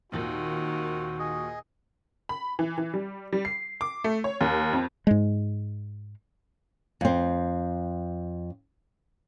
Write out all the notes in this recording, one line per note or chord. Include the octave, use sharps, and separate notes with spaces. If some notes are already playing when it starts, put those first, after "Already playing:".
D#2 A#2 D#3 C4 F#4
G#4 D#5
B5
E3
E3
G3
G3
C7
D6
A3
C#5
D#2
F2
G#2 G#3
F2 C4